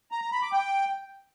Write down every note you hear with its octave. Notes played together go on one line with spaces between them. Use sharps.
A#5
A#5
B5
D6
G5